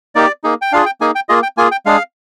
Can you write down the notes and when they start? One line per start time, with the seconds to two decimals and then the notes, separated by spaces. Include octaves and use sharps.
0.15 A#3 D#4 G4 D5
0.44 A#3 D#4 G#4
0.62 G5
0.72 D4 F4 G#4 F5
0.86 G5
1.01 A#3 D#4 G#4 G#5
1.15 G5
1.29 A#3 F4 G#4 D#5
1.43 G5
1.57 A#3 F4 G#4 G#5
1.71 G5
1.86 G#3 D4 G#4 F5